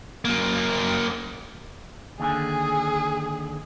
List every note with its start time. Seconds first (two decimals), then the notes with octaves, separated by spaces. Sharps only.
0.25 F#2 A#3
2.20 D#2 D3 G#4 G#5